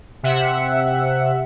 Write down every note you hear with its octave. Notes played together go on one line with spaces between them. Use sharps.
C3 E5 F#5